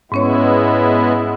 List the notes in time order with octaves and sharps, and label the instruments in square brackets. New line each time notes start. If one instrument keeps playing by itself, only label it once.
[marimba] G#2 C#4 C#5 [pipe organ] G#3 B3 E4